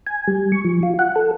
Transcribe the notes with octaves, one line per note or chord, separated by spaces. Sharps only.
G#5
G3
C#6
F3
F4
F#5
A4